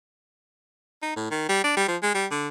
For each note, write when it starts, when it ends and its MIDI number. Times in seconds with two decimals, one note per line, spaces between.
1.02 1.13 63
1.16 1.26 45
1.31 1.49 51
1.49 1.61 55
1.64 1.75 62
1.76 1.85 55
1.88 1.97 53
2.02 2.14 56
2.14 2.26 55
2.31 2.48 50